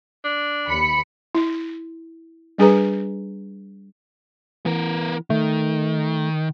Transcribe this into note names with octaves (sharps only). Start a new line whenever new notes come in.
D4
D#2 B5 C#7
E4
G3 D4 G#4 B4 A#5
E3 B3 A#4
D#3 A3